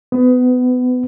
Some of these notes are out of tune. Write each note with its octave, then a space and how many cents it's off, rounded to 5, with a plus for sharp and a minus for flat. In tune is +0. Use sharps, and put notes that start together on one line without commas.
B3 +25